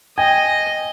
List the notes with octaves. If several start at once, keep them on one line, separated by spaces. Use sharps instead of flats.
D#5 G5 G#5